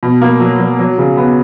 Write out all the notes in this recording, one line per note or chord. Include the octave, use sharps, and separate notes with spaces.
B2
A#3
F#3
F#3
F#3
C#3
B3